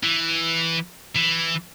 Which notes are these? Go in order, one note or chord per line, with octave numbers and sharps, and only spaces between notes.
E3
E3